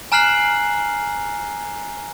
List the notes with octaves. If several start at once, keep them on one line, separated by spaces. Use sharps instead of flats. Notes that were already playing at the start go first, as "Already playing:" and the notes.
G#5 A#5 F6 F#6 C7 F#7